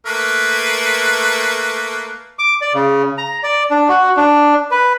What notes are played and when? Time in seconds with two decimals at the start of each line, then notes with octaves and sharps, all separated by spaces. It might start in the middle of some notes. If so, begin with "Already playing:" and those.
0.06 A3 A#3 B4
2.39 D6
2.61 D5
2.74 C#3
3.18 A#5
3.43 D5
3.71 D4
3.89 F#4
4.17 D4
4.71 B4